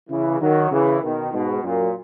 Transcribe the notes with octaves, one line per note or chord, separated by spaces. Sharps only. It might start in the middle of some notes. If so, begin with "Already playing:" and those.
C#3 E3
D#3 F#3
C#3 E3
B2 D#3
G#2 B2
F#2 A#2